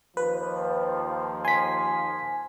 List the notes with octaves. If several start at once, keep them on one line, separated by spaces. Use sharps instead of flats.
D#2 F3 B4
G#5 C6 B6